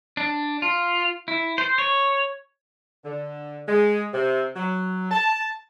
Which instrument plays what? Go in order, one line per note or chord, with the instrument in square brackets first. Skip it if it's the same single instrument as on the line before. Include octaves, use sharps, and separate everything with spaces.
[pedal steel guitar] D4
F4
E4
C5
C#5
[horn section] D3
G#3
C3
F#3
A5